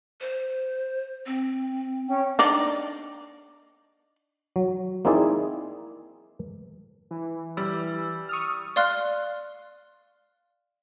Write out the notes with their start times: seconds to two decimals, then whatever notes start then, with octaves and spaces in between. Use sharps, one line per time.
0.21 C5
1.26 C4
2.07 C#4 G5
2.39 D4 D#4 D5
4.56 F#3
5.05 A#3 C4 D#4 E4 G#4 D5
7.11 E3
7.57 G3 E6
8.29 C#6 D#6 F6
8.76 D5 F5 C6 F6 F#6